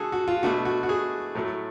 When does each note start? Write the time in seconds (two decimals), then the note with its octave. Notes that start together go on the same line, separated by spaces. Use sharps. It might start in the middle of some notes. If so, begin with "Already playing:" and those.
Already playing: D3 A3 F#4 G#4 A4
0.12 F#4
0.28 F4
0.43 B2 A3 D4 F#4
0.65 F#4
0.83 F#4
0.89 G#4
1.35 A2 F#3 A3